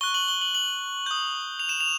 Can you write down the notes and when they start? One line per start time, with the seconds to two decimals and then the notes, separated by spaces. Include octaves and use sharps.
0.01 C#6 F#6 G7
0.14 F#7
0.28 G7
0.41 F#7
0.55 F#7
1.06 D#6 G6
1.59 F7
1.69 E7
1.81 F7